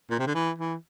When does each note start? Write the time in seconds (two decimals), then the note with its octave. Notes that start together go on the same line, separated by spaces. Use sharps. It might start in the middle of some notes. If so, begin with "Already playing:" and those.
0.11 A#2
0.19 C3
0.27 D3
0.35 E3
0.58 E3